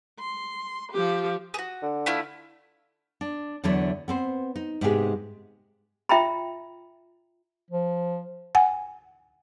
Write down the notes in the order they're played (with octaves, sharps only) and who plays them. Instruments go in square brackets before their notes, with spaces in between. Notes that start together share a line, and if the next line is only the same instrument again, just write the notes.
[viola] C6
F3 G4
[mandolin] F#4 G#4
[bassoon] D3
[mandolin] A3 E4 F4
[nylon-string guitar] D4
E2 D3 F#3 D4 C#5 E5
B3 C4 C5
D#4
G#2 C3 G#3 B3 G4 G#4
[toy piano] F4 E5 G5 A#5 B5
[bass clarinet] F3
[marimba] F#5 G#5